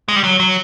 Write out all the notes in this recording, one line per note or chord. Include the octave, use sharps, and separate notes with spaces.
G#3
G3
F#3
F#3